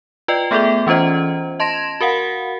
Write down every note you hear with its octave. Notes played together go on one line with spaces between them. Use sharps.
F4 B4 D5 D#5 G5
A3 B3 G#4 A4 D5 E5
E3 C#4 F4 C5 D#5
D#5 A5 C6 G#6 A#6 E7
F#4 A#4 F5 F#5